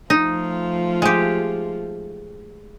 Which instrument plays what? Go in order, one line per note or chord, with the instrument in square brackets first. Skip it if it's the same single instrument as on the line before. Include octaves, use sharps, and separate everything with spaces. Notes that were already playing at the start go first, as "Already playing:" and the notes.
[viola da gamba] F3 A3 F4 [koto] D#4
[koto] G#3 G4